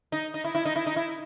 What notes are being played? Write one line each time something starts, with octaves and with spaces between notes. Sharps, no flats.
D#4
D#4
E4
E4
D#4
E4
D#4
E4